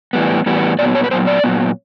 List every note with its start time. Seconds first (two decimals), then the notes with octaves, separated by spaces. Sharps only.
0.13 A2 E3 G3 B3
0.46 A2 E3 G3 B3
0.79 A#2 F#3 B3 D5
0.95 C#5
1.04 B4
1.11 A#2 F#3 B3 C5
1.27 D5
1.44 A#2 F#3 B3